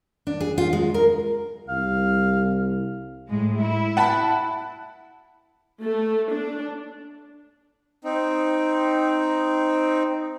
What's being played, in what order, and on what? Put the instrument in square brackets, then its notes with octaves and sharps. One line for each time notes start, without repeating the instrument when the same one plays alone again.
[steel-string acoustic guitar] D4
G#4
F4
G#3
A#4
[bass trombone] C2 [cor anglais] F5
[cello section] A2 G#3
E4
[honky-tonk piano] F#5 A5 B5
[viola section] A3
D4
[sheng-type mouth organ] C4 D#4